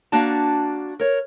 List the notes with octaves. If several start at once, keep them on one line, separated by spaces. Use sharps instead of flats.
A#3 D4 F#4 D5 A5
A#4 C#5